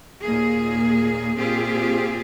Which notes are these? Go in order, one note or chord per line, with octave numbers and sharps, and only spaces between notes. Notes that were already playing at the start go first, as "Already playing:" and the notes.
D#2 A#2 A#3 G#4
A#2 C4 F4 G4 G#4